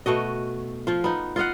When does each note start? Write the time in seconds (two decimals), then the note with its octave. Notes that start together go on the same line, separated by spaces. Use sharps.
0.06 B2 A3 F#4 D#5
0.87 F3 F4
1.04 B3 D#4
1.36 F4 D#5 F5 F#5